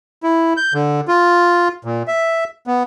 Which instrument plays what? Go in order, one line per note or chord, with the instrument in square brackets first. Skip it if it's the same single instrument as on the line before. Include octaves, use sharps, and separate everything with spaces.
[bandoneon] E4
G6
D3
F4
A#2
E5
B3